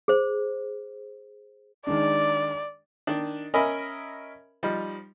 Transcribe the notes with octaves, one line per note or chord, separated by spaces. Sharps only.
G#4 C5
D#3 G#3 D4 D5
D#3 D4
C#4 A#4 D#5 E5 G#5 B5
F3 G3 D#4